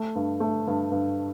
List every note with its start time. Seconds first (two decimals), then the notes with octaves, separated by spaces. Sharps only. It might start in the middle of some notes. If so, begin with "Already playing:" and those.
Already playing: A3
0.15 G2
0.40 A3
0.67 G2
0.91 G2